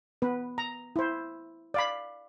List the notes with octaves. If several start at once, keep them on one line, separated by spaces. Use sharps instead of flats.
B3 B4
A#5
E4 C5
D5 F5 B5